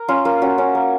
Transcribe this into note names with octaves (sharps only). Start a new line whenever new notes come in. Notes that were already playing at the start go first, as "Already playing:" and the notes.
Already playing: A#4
C#4 F4
A#3 F4
C#4 F#4
C#4
A#3